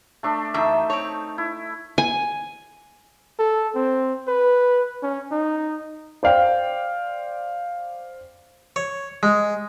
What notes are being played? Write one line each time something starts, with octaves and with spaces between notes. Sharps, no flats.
A3 D4 E5
F#2 E3 A3 D#4 E5
C4 C#5
E4
G#5
A4
C4
B4
C#4
D#4
C5 D5 F5 G5
C#5
G#3